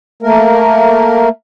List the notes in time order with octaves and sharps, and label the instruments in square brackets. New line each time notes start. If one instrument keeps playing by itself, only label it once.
[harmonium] A3 A#3 A#4